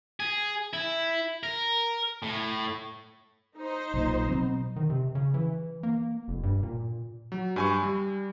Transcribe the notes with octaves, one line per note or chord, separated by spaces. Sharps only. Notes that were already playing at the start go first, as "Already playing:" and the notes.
G#4
E4
A#4
A2
D#4 C5
B1 A#2
B2 F#3 C4
D#3
C3
C#3
E3
A#3
F1
G2
A#2
F#3
G2 G#5 C#6
G3